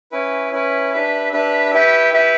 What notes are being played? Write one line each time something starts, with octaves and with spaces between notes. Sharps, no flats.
C#4 E4 B4
C#4 E4 B4
D4 G4 B4 E5
D4 G4 B4 E5
E4 G4 B4 E5 G5
E4 G4 B4 E5 G5